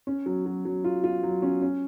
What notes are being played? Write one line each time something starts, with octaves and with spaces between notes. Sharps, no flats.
C#4
F#3
F#3
F#3
F4
F4
F#3
C#4
C#4